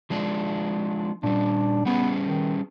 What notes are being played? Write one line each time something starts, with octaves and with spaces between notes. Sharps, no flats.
F3 G#3 D4
A#2 G3 D4
G3 B3 C#4 G#4
D#3